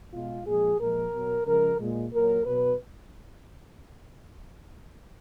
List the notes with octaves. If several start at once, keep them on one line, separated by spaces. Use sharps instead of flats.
B2 G#3 F4
A#2 F3 G#3 G#4
A#2 F3 G#3 A#4
B2 F#3
C#3 F3 G#3 A#4
A#2 G#3
A#2 F#3 A#4
B2 F#3 B4